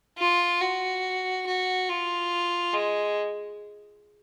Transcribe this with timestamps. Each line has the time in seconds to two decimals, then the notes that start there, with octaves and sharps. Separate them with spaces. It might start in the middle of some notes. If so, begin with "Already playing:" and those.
0.18 F4
0.61 F#4
1.47 F#4
1.89 F4
2.74 G#3